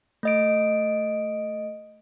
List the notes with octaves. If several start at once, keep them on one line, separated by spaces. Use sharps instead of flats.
A3 D#5 D7